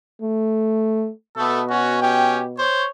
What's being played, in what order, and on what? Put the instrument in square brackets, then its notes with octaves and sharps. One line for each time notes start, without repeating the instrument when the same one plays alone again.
[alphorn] A3
[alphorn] B2 [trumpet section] A3 B3 A4
[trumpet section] C#4 F#4
C#4 G4 G5
C5 C#5